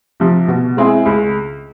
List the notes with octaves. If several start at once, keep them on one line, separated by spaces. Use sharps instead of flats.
C3 F3
B2
G#3 C4 E4 G#4
C#2